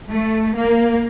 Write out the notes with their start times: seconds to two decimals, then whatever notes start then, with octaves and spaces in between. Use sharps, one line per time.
0.10 A3
0.57 A#3